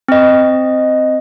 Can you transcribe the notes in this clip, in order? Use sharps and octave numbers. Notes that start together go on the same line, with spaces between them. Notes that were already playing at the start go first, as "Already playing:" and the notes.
C4 D#5